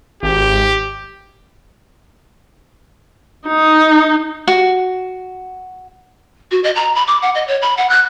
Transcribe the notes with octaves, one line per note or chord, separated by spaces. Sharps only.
G#1 G4
D#4
F#4
F#4
D#5
A#5
B5
D6
F#5
D#5
C#5
B5
F#5
F#6